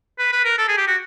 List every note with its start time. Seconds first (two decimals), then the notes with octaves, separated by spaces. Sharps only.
0.19 B4
0.32 B4
0.45 A#4
0.58 A4
0.68 G#4
0.77 G4
0.87 F#4